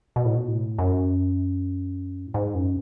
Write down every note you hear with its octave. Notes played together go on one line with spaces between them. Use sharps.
B2
A2
B2
A2
F#2
A2
G#2
F#2